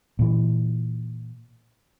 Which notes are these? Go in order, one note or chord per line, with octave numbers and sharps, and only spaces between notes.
A#2 E3